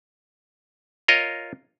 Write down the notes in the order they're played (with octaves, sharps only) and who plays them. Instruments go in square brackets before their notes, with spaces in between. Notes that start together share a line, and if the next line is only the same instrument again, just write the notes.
[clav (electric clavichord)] F4 A#4 C#5 D#5